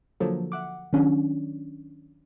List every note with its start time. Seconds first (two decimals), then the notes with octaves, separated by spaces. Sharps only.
0.20 D3 F3 F#3 A#3 A4
0.52 E5 F#5 D6
0.93 D#3 F#3 C#4 D4